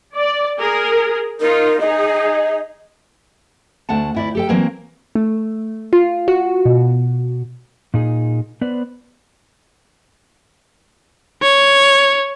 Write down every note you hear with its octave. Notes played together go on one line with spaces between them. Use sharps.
D5
G#4 A#4
D#4 F4 A#4
D#4 G#4 D#5
D2 A3 D4 F#5 A5
D2 E4 D5
G4 A4 G5
E3 F#3 A#3 C4 A#4
A3
F4
F#4
B2
A#2 D#4 G#4
B3 B4 C5 D5
C#5